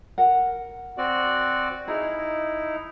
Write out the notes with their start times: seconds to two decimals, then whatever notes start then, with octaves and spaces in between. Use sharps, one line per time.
0.18 A#4 F#5
0.98 C4 F#4 D5
1.88 D#4 E4 G#4